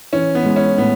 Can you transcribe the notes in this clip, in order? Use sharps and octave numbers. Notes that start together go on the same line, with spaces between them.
E3 C#4
B3
G#3
C#4
A2 B3